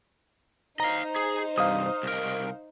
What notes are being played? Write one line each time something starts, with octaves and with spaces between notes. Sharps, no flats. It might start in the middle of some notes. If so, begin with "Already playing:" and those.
D#4 C5 D#5 F5 A#5
G#4
C2 G2 F5 D#6
C2 A#4